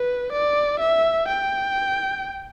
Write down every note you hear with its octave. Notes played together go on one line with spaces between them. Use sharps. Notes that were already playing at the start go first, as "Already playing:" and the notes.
Already playing: B4
D5
E5
G5